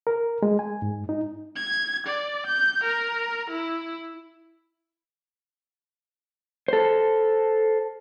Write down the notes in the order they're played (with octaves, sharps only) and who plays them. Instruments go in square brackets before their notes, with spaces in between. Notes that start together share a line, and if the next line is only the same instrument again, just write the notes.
[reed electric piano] A#4
G#3
G#5
G#2
D#4
[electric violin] G#6
D5
G6
A#4
E4
[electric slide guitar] A4 C5